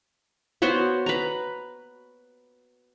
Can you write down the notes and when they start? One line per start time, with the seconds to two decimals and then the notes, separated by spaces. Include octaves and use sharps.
0.62 B3 F#4 C5 C#5
1.06 B4 A#5